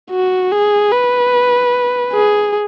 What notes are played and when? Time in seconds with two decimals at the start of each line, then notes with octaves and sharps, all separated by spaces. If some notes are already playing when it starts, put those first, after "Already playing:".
0.11 F#4
0.52 G#4
0.92 B4
2.13 G#4